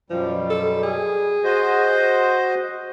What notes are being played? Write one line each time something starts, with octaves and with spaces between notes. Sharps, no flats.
F#2 B2 F3 G3
A4
G#4
F#4 C5 D#5